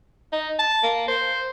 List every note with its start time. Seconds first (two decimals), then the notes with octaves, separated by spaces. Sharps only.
0.33 D#4
0.59 A5
0.83 A#3
1.08 C5